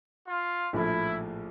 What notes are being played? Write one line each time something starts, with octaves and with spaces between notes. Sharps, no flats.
F4
A#1 A2 F3 E4